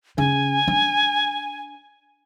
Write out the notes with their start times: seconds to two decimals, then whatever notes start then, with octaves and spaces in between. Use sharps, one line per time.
0.18 C#3 G#5
0.68 D4